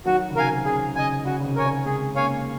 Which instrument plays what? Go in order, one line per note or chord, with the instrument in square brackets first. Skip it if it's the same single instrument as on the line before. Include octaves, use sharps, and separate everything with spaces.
[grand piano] D#3 F#3 [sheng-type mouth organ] F#4
[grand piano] C#3
[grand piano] C3 D#3 [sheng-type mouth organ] A#4 F5 G#5
[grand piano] C#3 [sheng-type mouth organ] G#4
[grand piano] C#3 [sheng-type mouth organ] D#5 G#5
[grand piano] C#3 [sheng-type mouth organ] F#4
[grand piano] C#3
C3 D#3
[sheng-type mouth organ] A#4 C#5 G#5
[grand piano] C#3
[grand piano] G#3 C4 [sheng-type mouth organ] G#4
[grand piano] A#3 C#4 [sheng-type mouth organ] C#5 F5 G#5